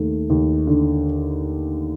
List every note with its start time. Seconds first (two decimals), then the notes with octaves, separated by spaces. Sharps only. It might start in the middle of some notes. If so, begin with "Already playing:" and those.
Already playing: D#2 A3
0.30 D#2
0.67 D3